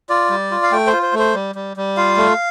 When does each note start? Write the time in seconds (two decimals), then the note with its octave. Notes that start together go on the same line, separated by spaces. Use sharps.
0.09 F4 D5
0.30 G3
0.51 F4
0.63 F5
0.72 A3 G5
0.87 C5
0.92 F4
1.03 C5
1.13 A3
1.19 C5
1.35 G3
1.55 G3
1.77 G3
1.97 F4 F5
2.17 A3